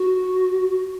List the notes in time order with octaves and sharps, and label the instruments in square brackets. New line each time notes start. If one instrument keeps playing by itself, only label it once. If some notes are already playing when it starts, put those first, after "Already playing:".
Already playing: [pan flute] F#4